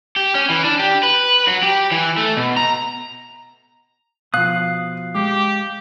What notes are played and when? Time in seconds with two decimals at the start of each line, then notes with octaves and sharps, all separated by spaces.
0.16 G4
0.35 C#4
0.50 E3
0.64 D4
0.79 G4
1.03 B4
1.47 F#3
1.63 G4
1.92 E3
2.18 A3
2.37 B2
2.57 A#5
4.34 B2 F3 F5 D#6 F#6
5.15 G#3 G4